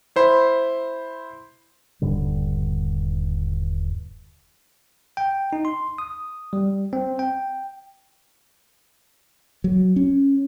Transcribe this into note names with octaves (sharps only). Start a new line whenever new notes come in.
E4 C5 B5 C6
D#1 G2 D3 G3
G5
D#4
C6
D#6
G3
C4
G5
F#3
C#4